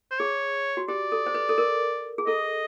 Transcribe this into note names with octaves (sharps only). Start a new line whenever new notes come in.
C5
G#4 C#5
F#4
G4 D5
A4
C5
B4
A4
A#4
G#4
A4 D#5